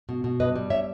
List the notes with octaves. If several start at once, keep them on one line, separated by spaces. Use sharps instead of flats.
B2
B2
G2 B4 D#5
G3
C#5 E5